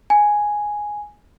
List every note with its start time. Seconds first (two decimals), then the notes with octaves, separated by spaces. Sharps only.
0.10 G#5